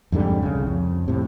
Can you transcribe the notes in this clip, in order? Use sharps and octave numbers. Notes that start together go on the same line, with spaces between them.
F2 G#2 D3 G3
C2 C#3
F2
A2 C3